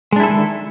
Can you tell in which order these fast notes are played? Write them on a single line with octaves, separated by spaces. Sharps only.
G#3 D4 E4 A4 D#3